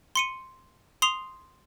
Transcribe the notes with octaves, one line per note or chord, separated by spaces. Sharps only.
C6 C#7 D#7
C6 D#6 C7 F7